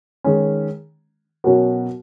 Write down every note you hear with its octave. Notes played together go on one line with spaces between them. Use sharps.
D#3 G#3 C#4
B2 F#3 C#4 F#4 A#4